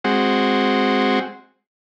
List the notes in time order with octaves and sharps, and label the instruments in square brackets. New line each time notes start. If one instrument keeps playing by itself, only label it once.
[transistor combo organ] G#3 C4 F#4